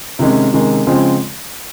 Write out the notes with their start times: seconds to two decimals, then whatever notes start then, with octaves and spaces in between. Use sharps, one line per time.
0.19 C3 D#3 G#3 C#4
0.53 C3 D#3 G#3 C#4
0.87 C#3 F3 G#3 C4